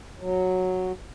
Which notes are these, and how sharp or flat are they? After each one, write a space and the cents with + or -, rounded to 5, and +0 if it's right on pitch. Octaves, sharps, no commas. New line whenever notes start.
F#3 -5